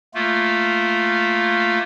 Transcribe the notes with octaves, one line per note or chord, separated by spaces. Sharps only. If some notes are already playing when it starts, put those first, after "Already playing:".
A3 A#3 F4